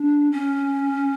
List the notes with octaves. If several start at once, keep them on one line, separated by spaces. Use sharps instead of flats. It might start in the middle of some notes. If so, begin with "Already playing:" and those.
Already playing: D4
C#4